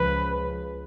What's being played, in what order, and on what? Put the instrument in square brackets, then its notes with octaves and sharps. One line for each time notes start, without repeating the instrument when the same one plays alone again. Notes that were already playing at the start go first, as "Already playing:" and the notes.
Already playing: [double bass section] C#2 C#3 F3 [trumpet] B4